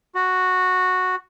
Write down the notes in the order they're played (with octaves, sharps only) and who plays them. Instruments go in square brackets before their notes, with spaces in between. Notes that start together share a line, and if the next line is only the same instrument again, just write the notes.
[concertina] F#4